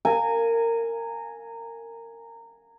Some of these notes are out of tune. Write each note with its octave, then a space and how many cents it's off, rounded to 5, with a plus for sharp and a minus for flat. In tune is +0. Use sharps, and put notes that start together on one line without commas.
A#4 -20 G#5 +0